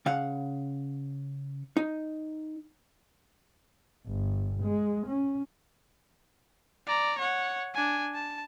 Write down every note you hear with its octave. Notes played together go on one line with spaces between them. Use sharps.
C#3 F5 F#5
D#4
G1
G#3
C#4
D5 A#5
C#5 F#5
D4 G#5
A5